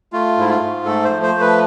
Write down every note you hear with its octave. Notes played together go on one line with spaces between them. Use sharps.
A3 F4
G#2 E4
F4
G#2
A3 A4
C5
F3
C5
A3
B4